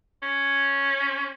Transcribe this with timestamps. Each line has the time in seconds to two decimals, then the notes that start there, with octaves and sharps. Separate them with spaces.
0.23 C#4